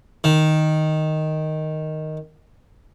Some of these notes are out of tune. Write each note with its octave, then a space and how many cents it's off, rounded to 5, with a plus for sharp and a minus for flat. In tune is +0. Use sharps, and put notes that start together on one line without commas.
D#3 +0